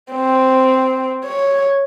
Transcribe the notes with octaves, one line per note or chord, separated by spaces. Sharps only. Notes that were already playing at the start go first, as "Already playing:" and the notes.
C4
C#5